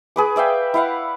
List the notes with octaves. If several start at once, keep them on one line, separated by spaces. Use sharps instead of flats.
G#4 B4 D6
D5 E5 F5 G5
E4 F5 F#5